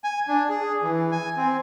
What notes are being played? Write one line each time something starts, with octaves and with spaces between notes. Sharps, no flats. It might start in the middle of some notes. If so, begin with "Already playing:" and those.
G#5
D4
G#4
E3
G#5
C4